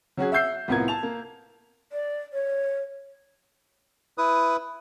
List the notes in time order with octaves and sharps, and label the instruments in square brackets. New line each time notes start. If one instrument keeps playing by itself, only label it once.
[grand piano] F#3 C#4 F#4 G#4
E5 F#5 E6 G6 C7
C2 A2 B3 F4 A#4 G#6
A5 F7
A#3
[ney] D5
C#5
[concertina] E4 B4 D#6